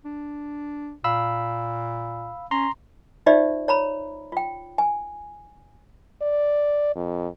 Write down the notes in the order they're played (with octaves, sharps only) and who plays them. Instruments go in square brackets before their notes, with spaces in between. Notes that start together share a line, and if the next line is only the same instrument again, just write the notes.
[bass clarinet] D4
[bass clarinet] A#2 [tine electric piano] F5 B5 E6
[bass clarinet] C#4 [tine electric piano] A#5 C6
[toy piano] D#4 F4 G4 C5 D5 E5
C#5 A#5 B5
F4 G5
G#5
[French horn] D5
F2